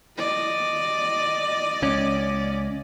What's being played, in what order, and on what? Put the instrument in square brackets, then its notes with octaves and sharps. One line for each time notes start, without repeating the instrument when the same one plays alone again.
[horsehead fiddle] D5 D#5
[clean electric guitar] C#2 C#4